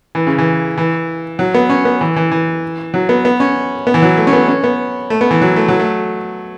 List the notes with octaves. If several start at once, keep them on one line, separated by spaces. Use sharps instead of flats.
E3
C#3
E3
E3
F#3
B3
C#4
B3
E3
E3
E3
F#3
B3
B3
C#4
B3
E3
F#3
A3
C#4
B3
C#4
B3
A3
B3
E3
F#3
A3
F#3
A3